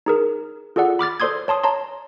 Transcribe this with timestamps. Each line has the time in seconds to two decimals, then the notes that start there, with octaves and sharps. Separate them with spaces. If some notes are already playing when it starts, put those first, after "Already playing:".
0.06 D#4 G#4 A#4
0.76 F4 G#4 A4 D5 F#5
0.99 B5 D6 F6 A6
1.20 A4 C5 D5 C6 D#6 G#6
1.48 C#5 A5 C6 D#6
1.63 C#5 A5 A#5 C6